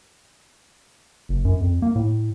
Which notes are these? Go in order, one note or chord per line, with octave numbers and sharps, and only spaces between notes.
F#1
F#2
F2
A#3
A2